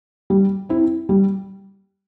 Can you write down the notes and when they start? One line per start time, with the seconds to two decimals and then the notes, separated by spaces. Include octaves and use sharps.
0.30 G3
0.69 C4 E4
1.09 G3